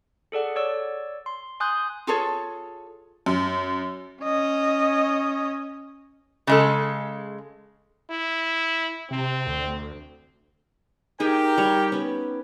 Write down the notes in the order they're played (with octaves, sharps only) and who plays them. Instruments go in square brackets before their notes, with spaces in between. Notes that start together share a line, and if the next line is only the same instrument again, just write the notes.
[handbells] G#4 A4 D5 F#5
C#5 D5 E6
C6
G#5 C6 D#6 F#6 G6
[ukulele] F4 G#4 A4 C#5
[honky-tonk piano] F#2
[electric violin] C#4 D#5
[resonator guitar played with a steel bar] C#3 G#3 A4
[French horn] E4
[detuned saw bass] C3 [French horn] C4
[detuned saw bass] D2
[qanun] D#4 G#4 E5 [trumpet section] G4 A#4 G5
[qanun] G3 C#5
B3 C#4